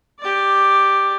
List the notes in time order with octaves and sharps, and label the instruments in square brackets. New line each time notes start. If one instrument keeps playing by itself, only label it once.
[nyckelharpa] G4 D5